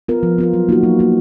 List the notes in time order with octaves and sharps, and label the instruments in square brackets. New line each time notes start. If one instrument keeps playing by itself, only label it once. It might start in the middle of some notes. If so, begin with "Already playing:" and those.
[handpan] B3 F4 A#4
F3
B3 F4 A#4
F#3
A#3 D#4 F#4
F#3
A#3 D#4 F#4